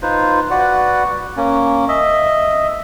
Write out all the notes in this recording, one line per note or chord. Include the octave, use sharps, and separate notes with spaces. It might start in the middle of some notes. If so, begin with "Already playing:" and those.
D#4 F4 B4 C5
F#4 B4 D5 F#5
A#3 C#4
D#5 E5